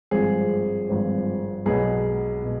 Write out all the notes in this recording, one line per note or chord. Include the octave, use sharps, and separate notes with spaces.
G#1 G2 F3 C4 G#4
G#1 G2 F3 C4
B1 B2 B3 G#4
B2